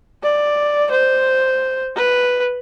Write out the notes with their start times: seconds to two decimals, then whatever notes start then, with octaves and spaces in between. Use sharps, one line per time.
0.23 D5
0.91 C5
1.96 B4